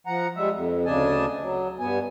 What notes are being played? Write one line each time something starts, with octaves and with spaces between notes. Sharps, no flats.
F3 F#5 A#5
G3 G#3 E5
F2
D2 C#3 D4 D#5 G#5 A5
F#3
G2 B3 G#5